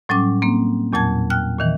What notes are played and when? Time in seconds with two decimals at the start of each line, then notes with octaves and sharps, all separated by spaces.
0.09 A2 F#3 G3 C#4 D6
0.42 A#3 C4
0.93 E2 A#2 F#3 A5 G#6
1.30 G5 F6 F#6
1.59 A#2 D#3 E3